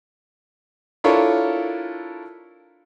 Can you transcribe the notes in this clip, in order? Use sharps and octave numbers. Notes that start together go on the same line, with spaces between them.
D4 E4 F4 A4 A#4 C#5